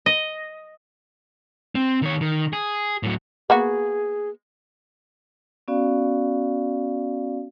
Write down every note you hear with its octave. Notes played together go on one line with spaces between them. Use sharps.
D#5
C4
D#3 C#5
D#3
G#4
A2 F#3
A#3 B3 F#4 G#4
B3 C#4 F#4 D5 F5